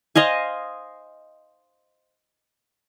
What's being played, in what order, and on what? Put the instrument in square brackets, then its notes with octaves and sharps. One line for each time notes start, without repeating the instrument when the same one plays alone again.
[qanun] C5 D#5 F5 G#5